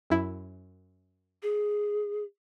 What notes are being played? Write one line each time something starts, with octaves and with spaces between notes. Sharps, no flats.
F#2 E4
G#4